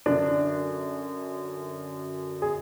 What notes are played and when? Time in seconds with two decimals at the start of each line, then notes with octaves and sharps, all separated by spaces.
0.06 F#2 D3 F#3 D4
2.42 G#4